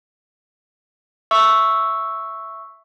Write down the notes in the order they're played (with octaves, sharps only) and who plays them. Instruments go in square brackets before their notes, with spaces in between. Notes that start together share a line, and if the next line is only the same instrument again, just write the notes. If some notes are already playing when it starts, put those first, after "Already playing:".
[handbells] E5 C#6 E6